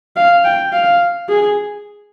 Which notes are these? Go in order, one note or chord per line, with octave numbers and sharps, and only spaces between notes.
F5
G5
F5
G#4